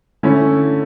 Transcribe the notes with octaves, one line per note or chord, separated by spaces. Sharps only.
D3 A3 C#4 E4